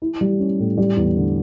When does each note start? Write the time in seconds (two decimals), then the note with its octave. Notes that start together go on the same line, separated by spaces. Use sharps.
0.02 E4
0.21 G3
0.40 C#4
0.59 A2
0.78 G3
0.97 E2
1.17 D3